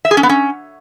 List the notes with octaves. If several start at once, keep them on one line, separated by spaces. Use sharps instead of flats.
E5
G#4
C#4
B3
C#4